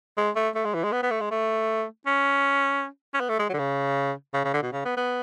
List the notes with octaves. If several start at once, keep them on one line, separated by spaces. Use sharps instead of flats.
G#3
A3
A3
G#3
E3
G#3
B3
B3
A3
G#3
A3
C#4
C#4
B3
A3
G#3
F#3
D3
C#3
C#3
C#3
D3
B2
C#3
B3
B3